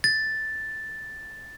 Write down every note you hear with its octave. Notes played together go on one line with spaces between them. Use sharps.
A6